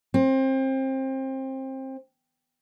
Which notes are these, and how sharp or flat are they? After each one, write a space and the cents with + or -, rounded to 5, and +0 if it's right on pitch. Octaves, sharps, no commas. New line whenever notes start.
C4 +25